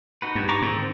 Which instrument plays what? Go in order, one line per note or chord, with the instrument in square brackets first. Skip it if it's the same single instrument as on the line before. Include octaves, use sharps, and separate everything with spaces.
[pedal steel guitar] D#4 F#4 B4
[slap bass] G2
[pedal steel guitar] A#5 C#6 D6
[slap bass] G#2 [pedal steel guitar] D3 D#3 C4